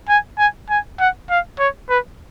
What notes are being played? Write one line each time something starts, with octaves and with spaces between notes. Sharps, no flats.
G#5
G#5
G#5
F#5
F5
C#5
B4